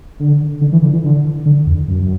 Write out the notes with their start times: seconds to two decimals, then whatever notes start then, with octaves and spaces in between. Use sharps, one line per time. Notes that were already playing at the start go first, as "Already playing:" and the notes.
0.20 D3
0.61 D3
0.72 E3
0.82 D3
0.93 E3
1.04 D3
1.46 D3
1.67 E2
1.88 F#2